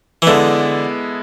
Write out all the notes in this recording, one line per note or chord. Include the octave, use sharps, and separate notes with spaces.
E3
D3 G#3 B3 E4 A4